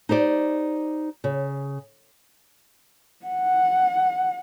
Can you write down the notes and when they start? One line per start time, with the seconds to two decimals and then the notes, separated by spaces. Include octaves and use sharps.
0.09 D#4 G4 C5 D5
1.24 C#3
3.26 F#5